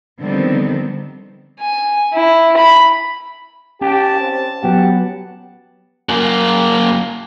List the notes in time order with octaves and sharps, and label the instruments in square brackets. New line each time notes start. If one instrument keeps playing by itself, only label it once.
[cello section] D3 D#3 F3 G3 B3 C4
[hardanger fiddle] G#5
E4
B5
[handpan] C#4 [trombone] G4 [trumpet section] A5
[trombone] C4
[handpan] F#3 B3 F#5 [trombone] G4
[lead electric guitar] F#2 A#3